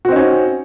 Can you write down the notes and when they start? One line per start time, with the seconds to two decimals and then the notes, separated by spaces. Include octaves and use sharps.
0.05 F#4
0.08 C4
0.12 D#4
0.16 C#4